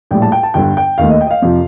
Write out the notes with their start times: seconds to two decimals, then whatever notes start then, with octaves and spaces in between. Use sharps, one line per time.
0.11 A#1 A2 G3 G5
0.22 A5
0.32 G5
0.43 A5
0.54 G1 G2 D3 G5
0.77 G5
0.98 D#2 D#3 A3 F5
1.10 D#5
1.21 G5
1.27 D#5
1.31 F5
1.42 F2 C3 F3